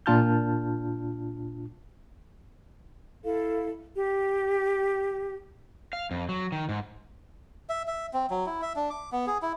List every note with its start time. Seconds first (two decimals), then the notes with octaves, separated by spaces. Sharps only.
0.06 A#2 D4 F4 A5 F6 G6
3.24 E4 A4 F5
3.95 G4
5.93 F5
6.11 F2
6.29 F#3
6.52 D#3
6.69 G#2
7.69 E5
7.87 E5
8.13 C4
8.30 F#3
8.46 E4
8.62 E5
8.76 D4
8.90 D6
9.12 B3
9.27 G#4
9.42 E4